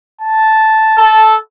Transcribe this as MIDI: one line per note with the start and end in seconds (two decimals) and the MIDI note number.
0.21 1.34 81
0.98 1.38 69